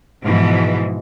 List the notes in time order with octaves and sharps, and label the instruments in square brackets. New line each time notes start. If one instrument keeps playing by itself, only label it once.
[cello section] G#2 B2 E3 F3